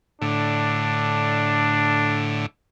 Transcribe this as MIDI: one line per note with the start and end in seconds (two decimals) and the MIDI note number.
0.22 2.46 45
0.22 2.46 50
0.22 2.32 62